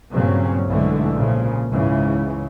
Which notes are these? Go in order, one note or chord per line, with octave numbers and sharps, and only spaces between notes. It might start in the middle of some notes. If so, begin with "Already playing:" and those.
G2 A#2 C#3 F#3 C4 C#4
B1 G#2 D3 E3 G#3 A3
A#2 C#3 F3
C#2 G#2 C#3 E3